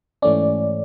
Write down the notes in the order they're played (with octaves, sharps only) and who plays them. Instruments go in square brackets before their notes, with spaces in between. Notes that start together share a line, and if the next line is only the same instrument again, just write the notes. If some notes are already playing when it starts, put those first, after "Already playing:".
[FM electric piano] G#2 E3 A3 C#4 [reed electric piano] D5